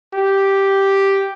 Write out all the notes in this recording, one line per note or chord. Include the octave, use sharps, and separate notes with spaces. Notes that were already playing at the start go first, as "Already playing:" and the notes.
G4